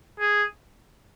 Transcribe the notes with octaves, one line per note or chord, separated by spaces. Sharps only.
G#4